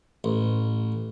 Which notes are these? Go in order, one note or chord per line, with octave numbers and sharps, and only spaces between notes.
A1